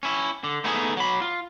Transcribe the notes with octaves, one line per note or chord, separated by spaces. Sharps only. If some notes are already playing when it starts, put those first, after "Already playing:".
C#4 E4
D3
A3 B3 D#4 G#4
F#3 B5
F4